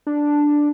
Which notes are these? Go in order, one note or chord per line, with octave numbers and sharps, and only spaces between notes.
D4